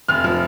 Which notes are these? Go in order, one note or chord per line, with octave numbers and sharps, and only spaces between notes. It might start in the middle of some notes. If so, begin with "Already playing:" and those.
F1 F6
F3